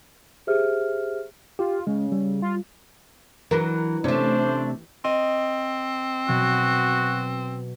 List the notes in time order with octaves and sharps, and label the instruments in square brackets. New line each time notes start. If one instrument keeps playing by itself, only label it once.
[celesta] G4 G#4 C5 E5 F6
[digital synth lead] F4 [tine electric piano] G4
[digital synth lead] C#3 [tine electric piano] G#3
[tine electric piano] G3
[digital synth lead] F4
[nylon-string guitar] E3 [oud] F#3 D4 A#4
[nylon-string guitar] C3 [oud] A3 C#4 [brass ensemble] D4 C5
[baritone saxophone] C4 [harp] D#5
[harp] B2 F#3 [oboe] F#4